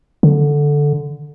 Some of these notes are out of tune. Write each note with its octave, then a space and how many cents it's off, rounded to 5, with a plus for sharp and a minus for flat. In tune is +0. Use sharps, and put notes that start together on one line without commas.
D3 -5